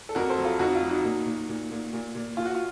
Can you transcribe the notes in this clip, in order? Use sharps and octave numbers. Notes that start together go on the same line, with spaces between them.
A4
F2 F#4 A#4
A4 C5
F#3
F4 A4
F2 D#4 F#4
F4
F#3
D#4 F#4
A#2
A#2
A#2
A#2
A#2
A#2
A#2 F4
F#4
F4